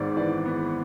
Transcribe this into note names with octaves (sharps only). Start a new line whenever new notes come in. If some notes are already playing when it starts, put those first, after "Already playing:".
Already playing: G#1 G#2 B3 D5
E3 D5
B3